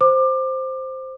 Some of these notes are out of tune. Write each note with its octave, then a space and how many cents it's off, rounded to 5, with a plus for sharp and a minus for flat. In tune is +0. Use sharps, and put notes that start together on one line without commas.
C5 +0 D6 +25